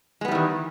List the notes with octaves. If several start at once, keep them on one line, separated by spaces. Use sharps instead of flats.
D#3 E3 G3 G#3 B3